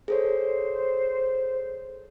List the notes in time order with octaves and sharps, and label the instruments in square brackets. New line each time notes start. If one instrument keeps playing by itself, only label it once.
[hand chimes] G#4 A4 C#5 [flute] C5